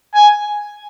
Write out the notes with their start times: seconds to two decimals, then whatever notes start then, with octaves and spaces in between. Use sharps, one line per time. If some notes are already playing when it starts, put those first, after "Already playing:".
0.15 G#5